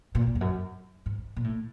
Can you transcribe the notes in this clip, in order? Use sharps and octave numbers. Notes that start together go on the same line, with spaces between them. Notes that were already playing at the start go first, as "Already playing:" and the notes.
A#2
F2
F#2
G#2
A#2
A2